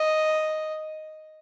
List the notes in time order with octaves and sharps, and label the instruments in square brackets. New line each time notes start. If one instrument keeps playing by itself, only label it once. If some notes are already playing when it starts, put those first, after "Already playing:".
Already playing: [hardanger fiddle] D#5